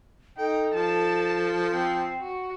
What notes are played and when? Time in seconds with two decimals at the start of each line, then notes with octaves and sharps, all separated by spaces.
0.38 D#4 A4 G5
0.74 F3 A5
1.73 C4
2.21 F#4